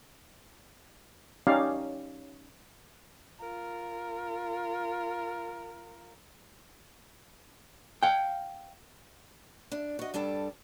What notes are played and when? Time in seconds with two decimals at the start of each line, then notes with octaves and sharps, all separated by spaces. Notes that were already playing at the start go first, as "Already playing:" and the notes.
1.47 C#4 D#4 G4 D5 F5
3.39 F4 A#4
8.03 F5 G5
9.72 D4
9.99 F#4 D#5
10.14 G2 G3 D4 A4 G5